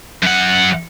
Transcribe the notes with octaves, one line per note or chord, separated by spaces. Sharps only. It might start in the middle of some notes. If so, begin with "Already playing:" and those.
F#2 F#5